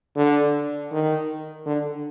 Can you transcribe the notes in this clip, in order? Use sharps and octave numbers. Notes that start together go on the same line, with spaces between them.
D3
D#3
D3